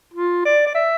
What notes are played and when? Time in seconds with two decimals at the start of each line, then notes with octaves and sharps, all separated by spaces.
0.14 F4
0.45 D5
0.67 D5
0.75 E5